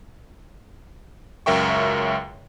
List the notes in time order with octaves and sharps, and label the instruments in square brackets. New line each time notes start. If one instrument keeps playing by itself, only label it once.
[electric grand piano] C#2 F#2 A#4 E5 G5 C#6